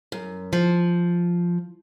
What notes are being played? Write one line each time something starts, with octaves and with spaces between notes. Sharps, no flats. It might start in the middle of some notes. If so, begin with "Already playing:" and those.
F#2
F3